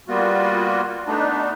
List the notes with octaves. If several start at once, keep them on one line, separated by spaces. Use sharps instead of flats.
G3 A#3 B3 F4 F#4
A3 B3 D4 D#4